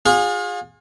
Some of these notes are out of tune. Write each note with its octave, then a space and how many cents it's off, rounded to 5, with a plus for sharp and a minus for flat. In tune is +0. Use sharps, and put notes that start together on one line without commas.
F4 +35 G#4 -15